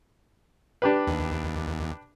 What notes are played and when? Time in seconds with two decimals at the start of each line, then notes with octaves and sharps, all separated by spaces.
0.82 D4 G4 B4
1.07 D#2